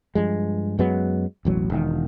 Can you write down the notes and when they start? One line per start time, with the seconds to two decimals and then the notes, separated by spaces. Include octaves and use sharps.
0.15 G2 F3 G#3
0.79 F#2 F#3 G#3 B3
1.45 E1 A1 F#3
1.70 E1 D#3